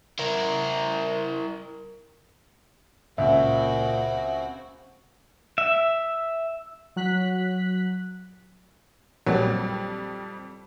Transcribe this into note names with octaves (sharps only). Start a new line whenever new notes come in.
E4 A#4
C#2 A#2 C4 F#4 E5
E5
F#3 F#6 B6
A#1 F2 F#3 G3